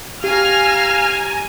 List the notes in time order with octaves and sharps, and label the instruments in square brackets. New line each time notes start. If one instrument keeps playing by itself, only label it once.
[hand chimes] G4 [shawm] F5 [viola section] G#5 A#5 [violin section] F6